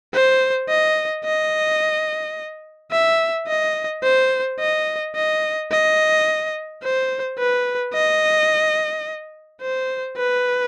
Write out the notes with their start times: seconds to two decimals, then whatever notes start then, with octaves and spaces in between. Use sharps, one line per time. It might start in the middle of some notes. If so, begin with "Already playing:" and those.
0.13 C5
0.69 D#5
1.24 D#5
2.91 E5
3.47 D#5
4.03 C5
4.60 D#5
5.15 D#5
5.71 D#5
6.83 C5
7.39 B4
7.94 D#5
9.62 C5
10.17 B4